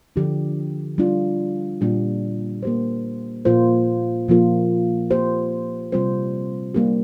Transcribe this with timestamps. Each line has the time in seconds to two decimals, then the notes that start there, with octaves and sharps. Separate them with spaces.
0.16 D3 F3 D4 G4
0.98 G3 D4 F4
1.81 A#2 G3 D4 G4
2.63 A#3 G4 C5
3.45 A#2 F3 A#3 F4 C5
4.28 A#2 F3 A#3 F4 A#4
5.10 A#3 G4 C5
5.92 C3 G3 C4 F4 C5
6.74 G3 A#3 D4 G4